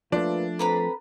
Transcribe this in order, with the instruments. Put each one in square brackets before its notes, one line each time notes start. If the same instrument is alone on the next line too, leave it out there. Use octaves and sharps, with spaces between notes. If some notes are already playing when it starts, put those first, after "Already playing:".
[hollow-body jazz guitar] F3 A3 [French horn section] A#3 F4 B4 [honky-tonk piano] D4
[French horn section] C4 A4 [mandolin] B4 A#5 B5